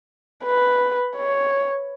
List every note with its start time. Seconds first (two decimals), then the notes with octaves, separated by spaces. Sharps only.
0.44 B4
1.17 C#5